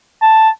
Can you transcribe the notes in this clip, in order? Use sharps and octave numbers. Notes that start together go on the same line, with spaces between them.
A5